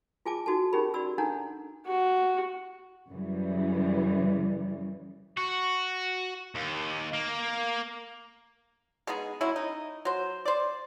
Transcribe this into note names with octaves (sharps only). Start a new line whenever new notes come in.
F4 G#4 G#5 A5 D6
D#4 F#4 A4 A5
C#4 D#4 G4 G#4 A#4 B5
F#4 D5 B5 E6
D4 D#4 A4 F#5 A#5
F#4
F#2 C#3 E3 G3
F#4
D#2
A#3
G#3 B3 D#4 G#4
F#3 G#3 C#4 E4
D#4
F#3 C5
C5 D5